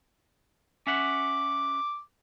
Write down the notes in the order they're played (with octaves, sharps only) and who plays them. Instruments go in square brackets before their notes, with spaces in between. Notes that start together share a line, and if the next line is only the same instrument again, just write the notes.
[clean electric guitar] C#4 E5 F#5 [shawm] D6